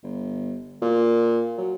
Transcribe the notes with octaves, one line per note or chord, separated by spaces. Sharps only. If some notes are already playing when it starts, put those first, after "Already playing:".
G1
A#2
F#3